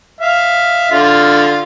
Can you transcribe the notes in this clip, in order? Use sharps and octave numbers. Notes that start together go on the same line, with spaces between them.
E5 F5
D3 F4 F5